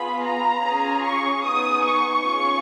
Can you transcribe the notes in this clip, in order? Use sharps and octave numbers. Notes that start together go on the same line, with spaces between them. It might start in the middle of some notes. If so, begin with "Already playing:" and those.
Already playing: B3 F4 G#4 B5
A#5
C#4 F4 G#4
C#6
B3 D#4 G#4 D#6
C#6
C#4 F4 G#4